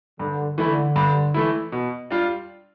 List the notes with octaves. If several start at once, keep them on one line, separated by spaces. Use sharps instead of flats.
G2 D3
D3 E3 A3 E4
G2
E3 A3 E4
B2
G3 D4 F4